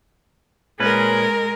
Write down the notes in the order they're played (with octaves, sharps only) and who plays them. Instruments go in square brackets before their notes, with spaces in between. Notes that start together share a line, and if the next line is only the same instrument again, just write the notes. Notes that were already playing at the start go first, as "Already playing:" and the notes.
[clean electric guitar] A#2 C#4 B4 [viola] G#3 A#4